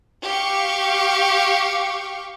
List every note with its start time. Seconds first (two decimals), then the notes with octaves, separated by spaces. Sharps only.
0.24 G4 F5 C#6